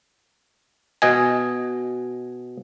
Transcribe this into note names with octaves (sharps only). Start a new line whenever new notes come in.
B2 D#5 G#5